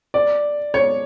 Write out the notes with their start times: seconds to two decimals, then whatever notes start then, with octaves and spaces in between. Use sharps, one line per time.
0.14 D5
0.74 C#5